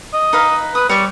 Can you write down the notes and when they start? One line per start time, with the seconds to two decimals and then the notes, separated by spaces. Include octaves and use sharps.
0.13 D#5
0.33 D#4 B4 F5
0.75 B4 D#6
0.89 G3 C#5 D5 C#6